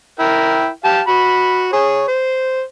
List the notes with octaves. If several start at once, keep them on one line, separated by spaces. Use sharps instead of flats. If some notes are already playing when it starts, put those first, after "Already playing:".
E4 A#4 G5
G4 F5 A5
F#4 B5
G#4 C#5
C5